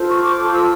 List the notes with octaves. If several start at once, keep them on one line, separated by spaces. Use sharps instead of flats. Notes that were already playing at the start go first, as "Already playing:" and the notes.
Already playing: F4 A4 C5
C#6
D6
E6